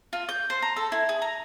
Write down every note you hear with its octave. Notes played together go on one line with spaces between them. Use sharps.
F4
G6
C5
A#5
A4
E4
G#4
A#5